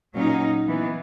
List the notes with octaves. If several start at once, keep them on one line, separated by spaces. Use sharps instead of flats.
A#2 F#3 C#4 D#4
E3 B3